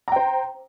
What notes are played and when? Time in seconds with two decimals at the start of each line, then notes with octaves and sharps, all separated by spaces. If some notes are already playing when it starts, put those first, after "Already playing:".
0.08 A#5
0.12 G5
0.16 C5